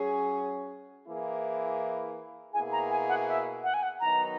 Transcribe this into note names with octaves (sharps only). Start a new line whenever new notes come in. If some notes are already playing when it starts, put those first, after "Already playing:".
Already playing: F#3 C#4 G#4
E3 A#3 E4 G#4
B2 A#3 E4 G#4 G#5
A#5
G#5
F#5
E5
F#5
G#5
F#5
D#3 F#3 B3 D#4 A#5